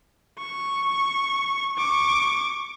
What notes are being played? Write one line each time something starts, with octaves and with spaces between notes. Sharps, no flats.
C#6
C#6 D6